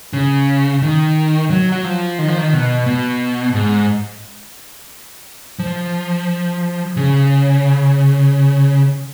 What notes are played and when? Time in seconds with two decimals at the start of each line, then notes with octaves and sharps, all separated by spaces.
0.13 C#3
0.82 D#3
1.50 F#3
1.72 F#3
1.84 F3
2.19 D#3
2.28 F3
2.38 D#3
2.53 B2
2.87 B2
3.54 G#2
5.59 F3
6.97 C#3